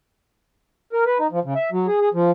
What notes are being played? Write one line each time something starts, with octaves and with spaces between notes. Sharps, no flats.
A#4
B4
D#4
F3
C#3
E5
F#3
G#4
G#4
F3